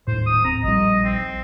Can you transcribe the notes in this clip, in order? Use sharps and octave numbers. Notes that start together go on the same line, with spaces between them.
D#1 A2 C5
D#6
C4 A#5
A#1 G3 D#5
C4